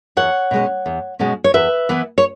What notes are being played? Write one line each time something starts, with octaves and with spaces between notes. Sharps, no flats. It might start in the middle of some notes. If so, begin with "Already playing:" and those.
E2 C#5 F#5
B2 G#3 C#4
E2
B2 G#3 C#4
C#5
E2 B4 E5
E3 B3 E4
C#5